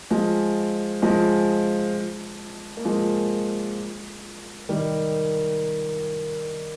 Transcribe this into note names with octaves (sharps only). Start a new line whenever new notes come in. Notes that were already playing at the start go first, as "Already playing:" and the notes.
F3 G#3
F3 G#3
A#3
F3 G#3
D#3 G3